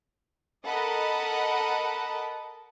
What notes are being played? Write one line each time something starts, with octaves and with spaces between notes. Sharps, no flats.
A4 A#4 D#5 F#5 B5